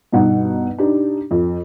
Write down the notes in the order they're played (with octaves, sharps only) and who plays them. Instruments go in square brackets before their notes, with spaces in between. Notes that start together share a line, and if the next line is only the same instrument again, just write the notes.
[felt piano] G2 B2 D#4 F#5
D4 D#4 G4
F2